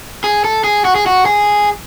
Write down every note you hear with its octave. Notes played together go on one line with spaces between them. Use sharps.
G#4
A4
G#4
F#4
G#4
F#4
G#4